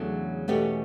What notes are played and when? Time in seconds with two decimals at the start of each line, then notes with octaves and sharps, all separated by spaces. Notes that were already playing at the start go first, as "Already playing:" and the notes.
Already playing: E2 C#3 F#3 A3 D4
0.48 E2 B2 A3 C#4 G4